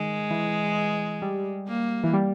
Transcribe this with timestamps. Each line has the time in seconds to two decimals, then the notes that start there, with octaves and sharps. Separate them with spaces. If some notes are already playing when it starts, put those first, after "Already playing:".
Already playing: D#3 G#3
0.31 E3
1.22 G3
1.68 A#3
2.04 E3
2.13 G3